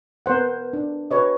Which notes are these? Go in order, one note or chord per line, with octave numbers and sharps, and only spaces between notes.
B3 A#4 C5 F#5
D4
F#4 B4 C#5 D#5